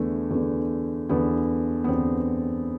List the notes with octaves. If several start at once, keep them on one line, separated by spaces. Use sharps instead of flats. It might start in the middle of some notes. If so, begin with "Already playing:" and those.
Already playing: E2 D3 A3
E2 D3
E2 D3 B3
B3
E2 D3 C4